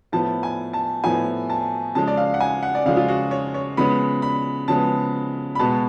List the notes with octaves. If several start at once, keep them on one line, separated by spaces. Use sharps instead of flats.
A2 F3 B3 A5
G#5
A5
A2 F3 B3 G#5
A5
C#3 F3 G#3 A5
D5
F5
F#5
G#5
F#5
D5
C#3 F3 G#3 F5
F4
F#4
C#5
C#5
C#3 F3 G#3 B3 B5
B5
C#3 F3 G#3 B3 A5
B5
B2 G#3 B3 A5